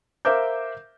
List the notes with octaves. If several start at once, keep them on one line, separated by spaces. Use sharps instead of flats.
A#4 C5 E5 F5 D6 G6